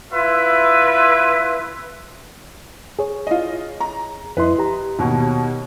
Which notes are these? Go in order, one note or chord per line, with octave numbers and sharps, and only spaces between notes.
E4 F4 B4 E5
G#4 C#5
F4 D#5
A#5
F2 E4 B4 D#5 C6
G4 A#5
D#2 B2